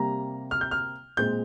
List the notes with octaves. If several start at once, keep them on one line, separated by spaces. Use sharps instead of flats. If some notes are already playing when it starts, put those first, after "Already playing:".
Already playing: C3 G3 A#3 A#5
F6
G6
F6
A#2 G#3 C4 G6